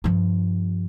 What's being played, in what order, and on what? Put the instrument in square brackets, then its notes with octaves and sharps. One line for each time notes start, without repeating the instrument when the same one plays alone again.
[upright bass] G2 F3